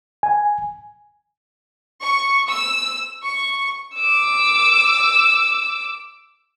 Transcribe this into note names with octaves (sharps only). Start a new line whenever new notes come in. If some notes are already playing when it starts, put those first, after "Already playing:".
G#5
C#6
E6
C#6
D6 E6